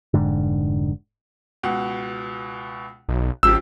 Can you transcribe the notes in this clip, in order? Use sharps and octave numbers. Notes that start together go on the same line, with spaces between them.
F1 G#2 D3
C#2 B2 F#5
B1
G#1 C#3 F3 G4 E6